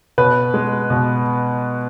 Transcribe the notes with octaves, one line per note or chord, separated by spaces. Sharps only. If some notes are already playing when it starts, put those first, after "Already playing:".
B2 B4
G#3
B2